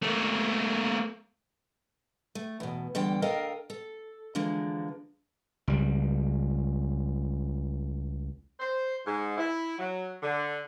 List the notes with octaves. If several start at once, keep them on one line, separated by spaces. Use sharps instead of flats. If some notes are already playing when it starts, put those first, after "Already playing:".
A3 A#3
A3
E2 B2
E2 D3 G3 G5
A4 A#4 D#5 F5 G5
A4
D3 E3 F3 G#3 A#3
C#2 G3
C5
G#2
E4
F#3
D3